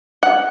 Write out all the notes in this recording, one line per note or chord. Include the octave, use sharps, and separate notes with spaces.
F#5